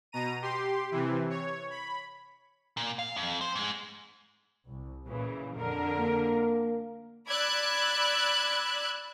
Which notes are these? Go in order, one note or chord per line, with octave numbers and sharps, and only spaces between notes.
B2 A#5 D#7
G4 C6
C3 E3
C#5
B5
A#2
F5
F2
C5
G#2 G#3
C2
A#2 C#3 E3
F2 D3 A#4
A#3
D5 B5 E6 F#6 G#6